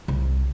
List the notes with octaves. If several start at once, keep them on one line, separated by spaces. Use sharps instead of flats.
C2